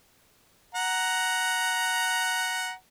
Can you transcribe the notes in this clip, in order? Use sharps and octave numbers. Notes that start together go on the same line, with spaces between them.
F#5 A#5